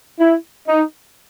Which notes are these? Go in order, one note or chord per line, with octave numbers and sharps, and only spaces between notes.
E4
D#4